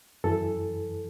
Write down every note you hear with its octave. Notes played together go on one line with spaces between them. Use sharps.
F#2 E3 A4